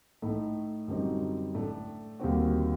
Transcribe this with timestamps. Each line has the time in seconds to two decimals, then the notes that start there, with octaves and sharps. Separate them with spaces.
0.22 A2 A3 D#4
0.88 F#2 D3 G3 C4 D#4
1.54 A2 A3 D4
2.20 D#2 D3 G3 C4 F#4